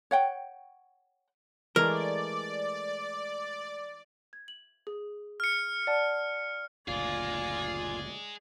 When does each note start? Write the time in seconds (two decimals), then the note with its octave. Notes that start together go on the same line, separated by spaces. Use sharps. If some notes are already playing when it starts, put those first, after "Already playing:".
0.11 C#5 F#5 G5
1.76 E3 G#3 A3 A#4 D5 F6
4.33 G#6
4.48 F#7
4.87 G#4
5.40 F6 C#7
5.87 D5 F#5 A5
6.88 F#1 D2 A#2 F4 G#4 D5 D#5 G#5